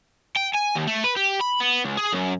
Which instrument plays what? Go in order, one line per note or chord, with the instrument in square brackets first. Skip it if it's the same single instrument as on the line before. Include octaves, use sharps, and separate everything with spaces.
[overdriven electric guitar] G5
G#5
D#2
A3
B4
G4
B5
B3
C#2
G#4
F#2